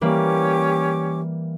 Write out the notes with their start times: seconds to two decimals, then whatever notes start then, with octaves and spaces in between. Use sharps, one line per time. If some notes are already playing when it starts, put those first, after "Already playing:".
0.01 E3 G3 A#3 C#4 G4 D6